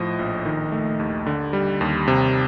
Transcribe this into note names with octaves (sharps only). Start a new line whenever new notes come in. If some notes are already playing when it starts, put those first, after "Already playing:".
Already playing: A2 F3 D#5
A#1
D#3
A3
D#2
D3
G3
D#2
C3